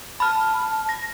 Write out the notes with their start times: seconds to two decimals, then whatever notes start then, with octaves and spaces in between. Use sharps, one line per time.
0.20 A5 B5 F6
0.89 A#6